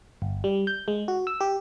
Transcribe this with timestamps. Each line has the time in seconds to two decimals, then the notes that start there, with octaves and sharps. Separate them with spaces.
0.22 G1
0.44 G3
0.67 G6
0.88 G#3
1.08 F#4
1.27 E6
1.41 G4